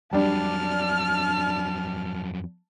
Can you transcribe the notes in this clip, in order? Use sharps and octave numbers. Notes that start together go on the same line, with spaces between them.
F2 F#3 G3 D4 A5 F6